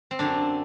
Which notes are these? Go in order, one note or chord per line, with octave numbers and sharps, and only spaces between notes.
C4
F#2 D3 D4